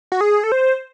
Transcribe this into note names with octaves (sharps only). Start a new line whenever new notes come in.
F#4
G#4
A4
C5